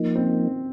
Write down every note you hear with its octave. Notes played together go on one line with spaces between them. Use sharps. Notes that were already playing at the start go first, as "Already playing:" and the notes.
Already playing: F3 A#3 D#4
C4